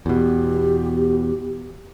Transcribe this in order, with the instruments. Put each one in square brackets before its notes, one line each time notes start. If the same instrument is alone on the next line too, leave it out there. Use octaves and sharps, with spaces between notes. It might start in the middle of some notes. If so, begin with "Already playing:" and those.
[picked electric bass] E2 B2 [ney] G4